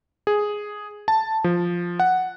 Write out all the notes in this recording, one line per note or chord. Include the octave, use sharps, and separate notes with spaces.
G#4
A5
F3
F#5